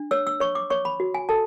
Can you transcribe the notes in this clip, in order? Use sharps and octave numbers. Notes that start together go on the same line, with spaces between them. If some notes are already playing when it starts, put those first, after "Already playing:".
Already playing: D4
C#5 E6
E6
C#5 C#6
D6
C#5 C#6
B5
F#4
G#5
A4 A5